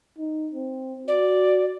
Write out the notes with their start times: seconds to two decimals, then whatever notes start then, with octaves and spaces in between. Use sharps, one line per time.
0.19 D#4
0.52 C4
1.07 F#4 D5